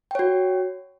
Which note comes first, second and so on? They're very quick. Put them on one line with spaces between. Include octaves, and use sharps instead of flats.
G5 C#5 F#4